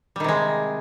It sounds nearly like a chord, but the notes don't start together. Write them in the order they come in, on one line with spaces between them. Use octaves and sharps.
G3 D#3 C3 G#3